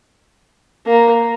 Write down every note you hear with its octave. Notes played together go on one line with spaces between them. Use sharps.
A#3